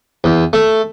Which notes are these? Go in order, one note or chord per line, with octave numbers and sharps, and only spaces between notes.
E2
A3